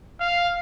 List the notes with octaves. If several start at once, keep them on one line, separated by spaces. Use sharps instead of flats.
F5